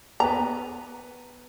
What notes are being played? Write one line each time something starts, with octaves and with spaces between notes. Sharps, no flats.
B3 B4 A#5